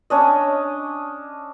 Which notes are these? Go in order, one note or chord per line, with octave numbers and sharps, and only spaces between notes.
C#4 D4 D#5